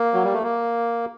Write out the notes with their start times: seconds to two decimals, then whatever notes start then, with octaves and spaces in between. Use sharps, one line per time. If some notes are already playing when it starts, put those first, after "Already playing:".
Already playing: A#3
0.14 F#3
0.24 G3
0.33 A3
0.43 A#3